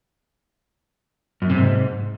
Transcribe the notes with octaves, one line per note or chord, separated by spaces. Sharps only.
F#2
C3
G#2